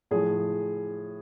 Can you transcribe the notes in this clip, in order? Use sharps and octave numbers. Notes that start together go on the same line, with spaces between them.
A2 F3 G#4